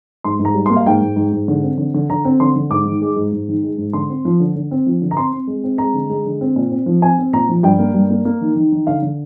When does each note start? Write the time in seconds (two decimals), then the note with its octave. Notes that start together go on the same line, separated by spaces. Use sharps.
0.24 G#2 C6
0.40 G#2
0.45 A#5
0.54 G3
0.66 C6
0.70 A#3
0.76 F5
0.86 G#2 G5
1.01 G#2
1.16 G#2
1.33 G#2
1.48 D3
1.63 C4
1.78 D3
1.94 D3
2.10 D3 A#5
2.25 C4
2.40 D3 C6
2.56 D3
2.70 G#2 D6
2.86 D#3
3.02 G#3
3.16 G#2
3.32 G#2
3.48 D#3
3.63 G#3
3.78 G#2
3.93 D3 C6
4.09 C4
4.25 F3
4.40 D3
4.56 D3
4.71 C4
4.86 F3
5.02 D3
5.11 A#5
5.17 C4 C6
5.33 C4
5.47 G#3
5.64 C4
5.78 G#3 A#5
5.94 D3
6.10 G#3
6.26 D3
6.41 C4
6.56 A#2
6.71 C4
6.86 F3
7.02 C4 G#5
7.18 C4
7.33 A#2 A#5
7.49 F3
7.63 G2 G5
7.79 A#3
7.94 G2
8.10 A#3
8.25 A#3
8.41 D#3
8.56 D#3
8.72 D#3
8.87 D3 F5
9.02 D3